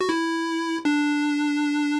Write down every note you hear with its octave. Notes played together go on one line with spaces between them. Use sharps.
F#4
E4
D4